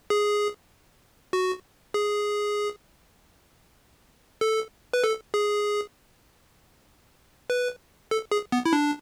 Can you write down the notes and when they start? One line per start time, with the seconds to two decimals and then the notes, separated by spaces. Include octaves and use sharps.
0.10 G#4
1.33 F#4
1.94 G#4
4.41 A4
4.93 B4
5.04 A4
5.34 G#4
7.50 B4
8.11 A4
8.31 G#4
8.52 B3
8.66 E4
8.73 D4